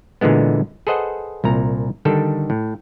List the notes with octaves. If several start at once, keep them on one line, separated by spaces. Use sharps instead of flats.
A#2 D3 E3 G#3 B3
G#4 A4 B4 C5 D#5 F#5
C2 A#2 A#5
D3 D#3 G3 D4 A4
A2